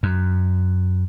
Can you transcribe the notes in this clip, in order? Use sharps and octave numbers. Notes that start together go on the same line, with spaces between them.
F#2